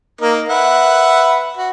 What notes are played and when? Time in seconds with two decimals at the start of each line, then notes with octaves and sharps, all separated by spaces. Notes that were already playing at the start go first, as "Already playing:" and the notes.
0.21 A#3 D#4 A#4
0.48 B4 E5 F#5
1.57 F#4